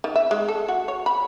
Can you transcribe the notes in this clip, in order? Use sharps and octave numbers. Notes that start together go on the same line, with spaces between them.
D#3
E5
G#3
A4
F#4
C#5
B5